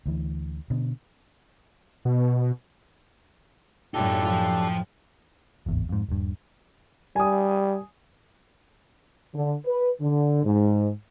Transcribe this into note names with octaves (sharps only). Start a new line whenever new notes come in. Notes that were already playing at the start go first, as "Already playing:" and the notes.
D2 E3
B2 D3
B2
F#2 A2 D4 D#4 F4 G4 A4 G5
F3 F4
D1 G#1 E2
F2 G#2
D#1 G2
G3 G#5 D#6
D3
B4
D3
G#2